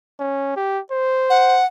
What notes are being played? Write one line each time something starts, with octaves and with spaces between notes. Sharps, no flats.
C#4
G4
C5
F#5